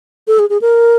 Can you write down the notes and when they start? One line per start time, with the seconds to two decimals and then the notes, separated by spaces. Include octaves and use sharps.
0.28 A4
0.39 G#4
0.50 G#4
0.61 A#4